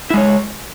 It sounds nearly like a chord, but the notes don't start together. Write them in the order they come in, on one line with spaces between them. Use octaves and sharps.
E4 G#3 C#5